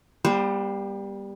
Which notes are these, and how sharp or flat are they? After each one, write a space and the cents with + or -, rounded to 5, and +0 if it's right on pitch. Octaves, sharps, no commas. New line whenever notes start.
G3 +15 B3 -40 C5 +0